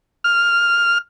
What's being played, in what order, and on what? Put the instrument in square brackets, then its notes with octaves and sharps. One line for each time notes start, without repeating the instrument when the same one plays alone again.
[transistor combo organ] F6